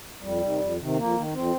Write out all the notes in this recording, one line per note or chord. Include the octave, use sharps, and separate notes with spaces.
F2 G3
C3 D#3
F2
C3 D#3
F2 A#3
D#3
F2 C4